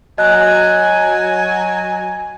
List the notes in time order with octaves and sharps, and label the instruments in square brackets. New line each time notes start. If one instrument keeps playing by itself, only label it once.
[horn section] F#3 G#5 [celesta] D#5 F#6